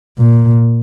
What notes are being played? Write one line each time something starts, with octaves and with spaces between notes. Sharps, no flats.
A#2